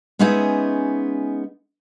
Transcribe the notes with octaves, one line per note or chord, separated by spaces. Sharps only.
G#3 B3 C#4 D#4 G#4 E5